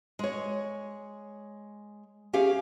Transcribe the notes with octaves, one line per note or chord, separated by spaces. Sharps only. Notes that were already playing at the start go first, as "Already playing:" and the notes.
G#3 C#5
C#4 G4 G#4 F5